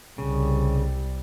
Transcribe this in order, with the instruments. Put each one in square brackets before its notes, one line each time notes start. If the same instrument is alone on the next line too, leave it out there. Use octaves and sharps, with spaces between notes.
[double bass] C2 G3 [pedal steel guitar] C#3